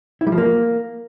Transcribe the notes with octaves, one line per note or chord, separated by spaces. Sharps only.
E4
G3
F3
A#3